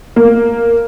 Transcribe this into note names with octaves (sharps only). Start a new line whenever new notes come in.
A#3